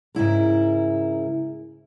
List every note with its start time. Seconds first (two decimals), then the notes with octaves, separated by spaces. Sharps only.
0.15 G#2 C#3 E4 A#4